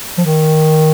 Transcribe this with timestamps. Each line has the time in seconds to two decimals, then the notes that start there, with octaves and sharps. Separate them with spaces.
0.18 F3
0.21 D#3